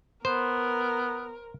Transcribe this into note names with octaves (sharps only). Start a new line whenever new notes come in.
B3 A#4 C5